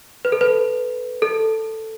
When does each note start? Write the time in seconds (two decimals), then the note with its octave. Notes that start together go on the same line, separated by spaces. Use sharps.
0.25 B4
0.32 A4
0.41 B4
1.22 A4